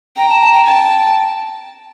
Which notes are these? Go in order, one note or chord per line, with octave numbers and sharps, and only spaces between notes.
G5 A#5
A5
A5
G5
G5 A5